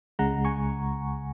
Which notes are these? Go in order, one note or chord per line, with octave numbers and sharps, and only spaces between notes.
C#2 C#3 G#3 F#5 A#5
G#5 C#6